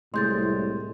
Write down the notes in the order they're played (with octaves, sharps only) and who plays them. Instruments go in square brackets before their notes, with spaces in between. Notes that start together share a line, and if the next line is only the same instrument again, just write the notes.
[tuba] C2 [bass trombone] A2 [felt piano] G#3 [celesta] C6 G6 A6